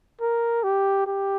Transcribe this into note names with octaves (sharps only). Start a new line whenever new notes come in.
A#4
G4
G4